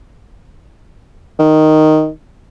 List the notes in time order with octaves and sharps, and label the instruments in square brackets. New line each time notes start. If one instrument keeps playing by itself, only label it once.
[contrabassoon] D#3